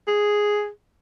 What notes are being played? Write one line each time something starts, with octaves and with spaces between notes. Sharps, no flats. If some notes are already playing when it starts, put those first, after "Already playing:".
G#4